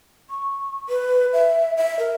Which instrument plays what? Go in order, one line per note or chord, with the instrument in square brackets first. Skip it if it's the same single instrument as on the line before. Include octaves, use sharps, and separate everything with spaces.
[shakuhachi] C#6
B4
E5
E5
A#4